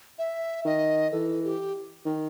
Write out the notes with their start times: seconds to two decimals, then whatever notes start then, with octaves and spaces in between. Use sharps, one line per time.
0.18 E5
0.65 D#3 D#5
1.12 E3 A4
1.44 G4
2.06 D#3